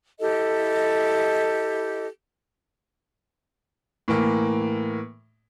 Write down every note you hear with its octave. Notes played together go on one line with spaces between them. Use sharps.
E4 G4 A4 D#5
A2 E3 A#3